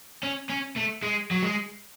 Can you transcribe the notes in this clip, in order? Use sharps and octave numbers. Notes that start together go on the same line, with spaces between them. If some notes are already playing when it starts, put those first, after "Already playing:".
C#4
C#4
A3
G#3
F#3
G#3